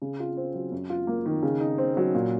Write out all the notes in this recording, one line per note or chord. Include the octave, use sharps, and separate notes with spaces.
C#3
F4
C4
F#3
F#2
F4
A#3
D#3
C#3
D#4
C4
F#3
A#2